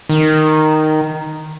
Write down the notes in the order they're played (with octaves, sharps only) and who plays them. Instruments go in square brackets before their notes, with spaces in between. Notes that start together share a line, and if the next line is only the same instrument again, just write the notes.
[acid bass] D#3